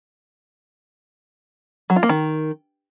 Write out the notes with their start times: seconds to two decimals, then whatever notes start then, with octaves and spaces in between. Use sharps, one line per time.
1.90 F#3
1.96 F4
2.03 A#3
2.09 D#3